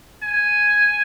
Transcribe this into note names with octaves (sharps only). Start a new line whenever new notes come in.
G#5